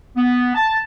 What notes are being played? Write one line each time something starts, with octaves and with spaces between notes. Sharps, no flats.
B3
A5